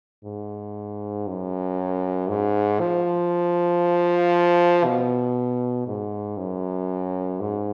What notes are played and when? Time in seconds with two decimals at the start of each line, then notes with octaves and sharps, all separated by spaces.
0.24 G#2
1.27 F#2
2.29 G#2
2.80 F3
4.85 B2
5.87 G#2
6.37 F#2
7.40 G#2